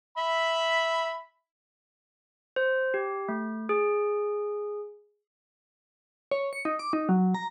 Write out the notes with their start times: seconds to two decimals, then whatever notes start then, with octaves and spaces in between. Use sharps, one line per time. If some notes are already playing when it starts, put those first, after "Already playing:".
0.17 E5 B5
2.56 C5
2.94 G4
3.29 A3
3.69 G#4
6.31 C#5
6.53 C#7
6.65 D#4
6.79 D6
6.93 D#4
7.09 F#3
7.35 A#5